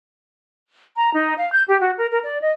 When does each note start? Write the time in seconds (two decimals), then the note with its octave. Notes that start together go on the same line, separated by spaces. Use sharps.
0.96 A#5
1.14 D#4
1.38 F5
1.53 G6
1.67 G4
1.81 F#4
1.97 A#4
2.11 A#4
2.24 D5
2.41 D#5